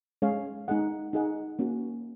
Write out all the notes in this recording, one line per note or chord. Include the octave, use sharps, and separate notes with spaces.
G#3 C#4 G#4 C#5 F5
G#3 D#4 G#4 D#5 F#5
D#4 G#4 D#5 F#5
A#3 C#4 F#4